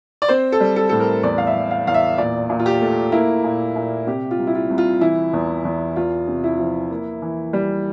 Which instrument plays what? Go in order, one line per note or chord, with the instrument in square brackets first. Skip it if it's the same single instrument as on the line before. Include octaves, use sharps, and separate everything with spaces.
[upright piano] D5
C4 C5
A4
G3
A4
A2 A4
A#4
E2 D5
F5
E5
E2
F5
E2 F5
E5
A#2 D5
A#2
F4
G4
A3
A#3 E4
A#2
A#2
C3 G4
F4
C2
E4
F4
C2
F4
E3 E4
E2
E2
E2 F4
C3
E4
F3
A#3
E3
G3